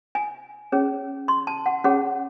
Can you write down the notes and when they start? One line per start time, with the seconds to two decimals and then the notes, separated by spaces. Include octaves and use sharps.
0.15 G#5
0.72 C#4 G#4 C#5
1.28 C6
1.47 A5
1.66 F#5
1.84 C#4 G#4 C#5 F#5